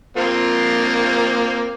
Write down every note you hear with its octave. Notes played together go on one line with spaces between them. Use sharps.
A#3 C4 F4